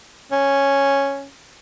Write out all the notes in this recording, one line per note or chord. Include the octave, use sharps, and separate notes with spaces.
C#4